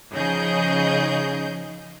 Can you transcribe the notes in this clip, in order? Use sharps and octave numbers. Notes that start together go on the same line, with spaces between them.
C#3 F3 D#4 G#4 D#5 G6